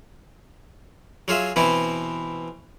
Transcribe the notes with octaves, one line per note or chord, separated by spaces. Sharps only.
F#3 F4 G#4 E5
B2 E3 C4 E4